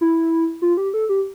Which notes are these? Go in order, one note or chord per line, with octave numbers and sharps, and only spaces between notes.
E4
F4
G4
A4
G4